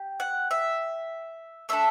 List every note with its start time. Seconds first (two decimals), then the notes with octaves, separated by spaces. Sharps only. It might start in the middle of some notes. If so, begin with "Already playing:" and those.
Already playing: G4
0.20 F#5
0.51 E5
1.69 A3 D4 A4 E5